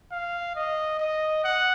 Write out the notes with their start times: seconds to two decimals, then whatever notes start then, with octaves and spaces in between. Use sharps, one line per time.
0.11 F5
0.56 D#5
1.00 D#5
1.44 F#5